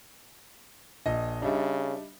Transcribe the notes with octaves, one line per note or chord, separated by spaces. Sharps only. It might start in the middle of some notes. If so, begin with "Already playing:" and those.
A#1 D#5
C#3 G3 D4 D#4 E5